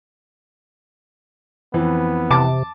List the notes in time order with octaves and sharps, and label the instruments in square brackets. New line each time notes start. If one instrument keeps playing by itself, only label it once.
[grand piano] F2 E3 [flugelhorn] B3
[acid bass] C3 [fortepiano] A5 D6